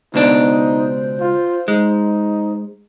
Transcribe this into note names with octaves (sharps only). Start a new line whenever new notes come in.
C#2 B2 D4 D#4 C5
F4
G#3 D#4